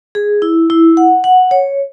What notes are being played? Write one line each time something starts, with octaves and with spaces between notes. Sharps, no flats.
G#4
E4
E4
F#5
F#5
C#5